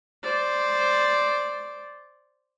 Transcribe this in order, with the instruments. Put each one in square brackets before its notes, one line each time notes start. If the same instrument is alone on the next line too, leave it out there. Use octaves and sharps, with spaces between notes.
[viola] C5 D5